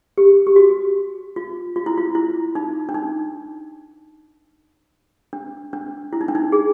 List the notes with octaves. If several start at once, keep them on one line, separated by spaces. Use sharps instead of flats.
G4
G4
F#4
F4
F4
E4
F4
E4
D#4
D4
D#4
D4
D4
E4
D#4
D4
D#4
G#4